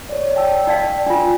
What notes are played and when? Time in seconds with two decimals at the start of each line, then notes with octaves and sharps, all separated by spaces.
0.09 C#5 D5
0.36 G5 A5 E6
0.67 D#4 D5 F5
1.06 D4 F4